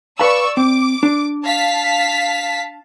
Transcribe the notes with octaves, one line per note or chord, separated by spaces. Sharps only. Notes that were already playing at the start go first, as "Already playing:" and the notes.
B4 D5 F5 A5 C#6 E6
C4 D6
D4
F5 A5 B6